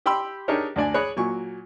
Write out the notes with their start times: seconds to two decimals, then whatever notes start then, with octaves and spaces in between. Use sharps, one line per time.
0.06 G4 G5 B5 C6 E6
0.48 D4 D#4 G4 G#4 A#4 C#5
0.76 D2 D4 D5 G#5
0.94 G#4 C#5 D5 B5 F#6
1.17 A#2 F#3 G#5 C#6